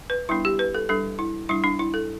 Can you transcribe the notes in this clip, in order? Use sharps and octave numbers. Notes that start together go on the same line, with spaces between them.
B4
G3 B3 D4 E4
G4
B4
A4
G3 D4 A4
E4
G3 D4 E4
D4
E4
A4